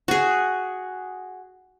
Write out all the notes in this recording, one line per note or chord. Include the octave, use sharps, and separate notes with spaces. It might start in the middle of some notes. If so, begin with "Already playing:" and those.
F#4 G#4